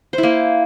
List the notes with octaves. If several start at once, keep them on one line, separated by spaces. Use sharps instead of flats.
C5
E4
A#3